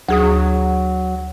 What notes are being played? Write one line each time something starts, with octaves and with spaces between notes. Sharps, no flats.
D2 F#3 G#4 D#6